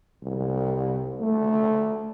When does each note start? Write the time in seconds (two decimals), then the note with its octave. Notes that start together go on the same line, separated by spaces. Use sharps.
0.23 C2
1.20 A3